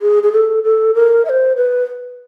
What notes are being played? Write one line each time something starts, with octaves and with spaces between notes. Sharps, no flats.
G#4
G#4
A4
A4
A#4
E5
C5
B4